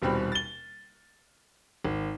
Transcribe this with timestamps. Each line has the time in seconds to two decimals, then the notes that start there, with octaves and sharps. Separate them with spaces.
0.02 D#1 B2 G3 C4 B5
0.32 A6 G7
1.85 G#1